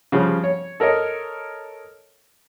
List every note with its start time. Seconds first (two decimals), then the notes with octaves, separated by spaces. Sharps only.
0.12 C#3 F3 G3
0.44 C#5
0.80 A4 A#4 C#5 D#5